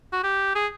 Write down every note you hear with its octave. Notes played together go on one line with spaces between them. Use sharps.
F#4
G4
G#4